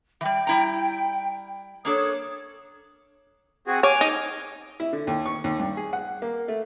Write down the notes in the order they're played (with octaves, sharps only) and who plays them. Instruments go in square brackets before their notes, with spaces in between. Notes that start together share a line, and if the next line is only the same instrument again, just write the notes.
[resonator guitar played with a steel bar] E3 G3 [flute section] G5
[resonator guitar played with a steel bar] G3 E4 A#5
[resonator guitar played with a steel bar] A#3 D4 A4 [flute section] C#5 D#6
[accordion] C4 F#4 G#4
[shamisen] C#5 [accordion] G#5 D6 F6
[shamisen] D#4
[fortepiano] E4
D3
D#2
C#6
D#2
G2
G#4
F#5
A#3
A3